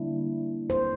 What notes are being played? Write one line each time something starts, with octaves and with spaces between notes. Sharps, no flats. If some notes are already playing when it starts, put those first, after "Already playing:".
Already playing: D3 G3 A#3 D4 E4
C5